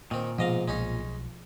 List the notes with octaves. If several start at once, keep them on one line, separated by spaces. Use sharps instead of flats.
A#2 D#3 C4
G#2 B2 F3 D#5 F5
B1 G#3 C#4 D#4